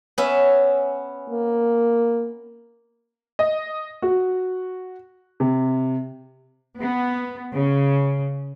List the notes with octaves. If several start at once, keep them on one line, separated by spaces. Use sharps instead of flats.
B3 C#4 E5
A#3
D#5
F#4
C3
B3
C#3